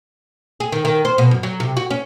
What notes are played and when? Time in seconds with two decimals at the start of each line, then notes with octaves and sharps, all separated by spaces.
0.60 G#4
0.72 D#3
0.85 D#3
1.05 C5
1.18 B2
1.31 F#2
1.43 F#3
1.60 C3
1.77 F#4
1.91 C#4